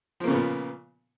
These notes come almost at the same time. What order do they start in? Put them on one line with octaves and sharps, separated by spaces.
F3 A#3 C#3 B3 A#2